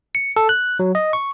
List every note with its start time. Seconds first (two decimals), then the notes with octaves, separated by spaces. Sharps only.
0.15 C#7
0.36 A4
0.49 F#6
0.79 F#3
0.95 D#5
1.13 C#6